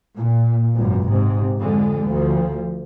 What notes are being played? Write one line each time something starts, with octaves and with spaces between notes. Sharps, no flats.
A#2
G#1 C#2 F#2
G#2 C3
F2 D3 G#3
D2 F3